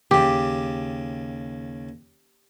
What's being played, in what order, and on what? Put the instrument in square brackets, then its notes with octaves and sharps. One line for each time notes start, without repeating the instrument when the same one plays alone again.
[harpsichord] D#2 C#3 [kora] G4